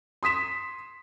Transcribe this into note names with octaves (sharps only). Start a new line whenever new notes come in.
C6 D#6 B6 E7